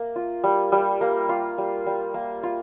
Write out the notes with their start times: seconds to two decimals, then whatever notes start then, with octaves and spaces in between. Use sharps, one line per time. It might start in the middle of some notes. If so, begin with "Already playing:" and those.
Already playing: A#3
0.16 F4
0.44 G3
0.72 G3
1.01 A#3
1.29 F4
1.58 G3
1.86 G3
2.14 A#3
2.43 F4